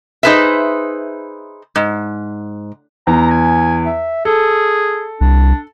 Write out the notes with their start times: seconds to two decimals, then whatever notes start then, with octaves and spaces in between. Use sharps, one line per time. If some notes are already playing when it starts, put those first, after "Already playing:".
0.23 D#4 G#4 B4 C5 E5
1.76 G#2
3.07 E2 A#5
3.30 G#5
3.86 E5
4.25 G#4 A4
5.21 C2 D4